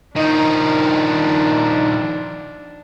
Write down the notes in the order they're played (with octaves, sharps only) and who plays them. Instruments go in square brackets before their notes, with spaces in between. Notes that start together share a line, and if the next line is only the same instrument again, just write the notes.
[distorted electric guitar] D#3 F3 [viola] D4 [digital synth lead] D#4